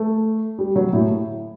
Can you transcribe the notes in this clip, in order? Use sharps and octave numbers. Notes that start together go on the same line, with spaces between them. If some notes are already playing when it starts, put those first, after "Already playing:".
Already playing: A3
G3
F#3
A2